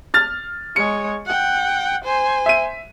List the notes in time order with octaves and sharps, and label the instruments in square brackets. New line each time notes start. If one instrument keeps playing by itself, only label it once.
[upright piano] F6 A6
[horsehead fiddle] G#3 C#5 [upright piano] C#7
[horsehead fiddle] F#5 G5
C5 G#5
[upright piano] E5 D#7